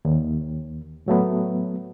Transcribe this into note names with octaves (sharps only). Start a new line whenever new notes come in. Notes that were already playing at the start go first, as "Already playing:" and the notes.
D#2
A2 F#3 A3 B3